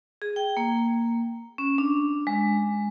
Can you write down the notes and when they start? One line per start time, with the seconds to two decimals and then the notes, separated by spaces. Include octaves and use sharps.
0.22 G#4
0.36 G5
0.57 A#3
1.58 C#4
1.78 D4
2.27 G#3